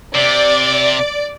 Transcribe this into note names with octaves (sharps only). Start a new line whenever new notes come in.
C3 D5